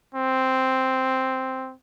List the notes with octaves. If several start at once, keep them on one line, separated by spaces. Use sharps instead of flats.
C4